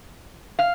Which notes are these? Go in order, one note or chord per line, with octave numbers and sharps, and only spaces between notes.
F5